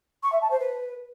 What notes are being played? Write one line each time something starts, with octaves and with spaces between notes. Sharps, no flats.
C#6
E5
A5
C5
B4